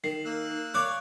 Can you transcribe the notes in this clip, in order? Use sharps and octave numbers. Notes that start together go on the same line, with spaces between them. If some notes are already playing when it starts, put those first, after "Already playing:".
D#3 C7
A#3 E6 F#6
C#5 D5 F5 D6 F#6